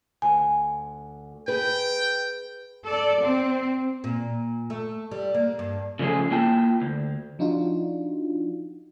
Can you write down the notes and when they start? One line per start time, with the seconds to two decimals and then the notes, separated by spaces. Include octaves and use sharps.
0.22 D2 G#5
1.48 G#4 B4 G5
2.85 A4 D5
3.21 C4
4.04 A#2
4.70 A3
5.11 G3
5.34 A#3
5.59 G2
5.99 C#3 F3 A3 C#4 E4 G#4
6.31 A#3 E4 F4 G5 A5
6.82 D2
7.39 F3 D4 D#4 F4 F#4